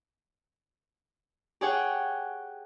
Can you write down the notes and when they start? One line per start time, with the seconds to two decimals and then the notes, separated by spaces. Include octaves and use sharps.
1.61 G4 G#4 C#5 F#5 G5